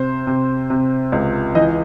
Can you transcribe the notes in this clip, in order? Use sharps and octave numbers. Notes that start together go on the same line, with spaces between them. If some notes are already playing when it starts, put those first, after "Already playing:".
Already playing: C3 C5
C3
C3
C#2
E3 D#5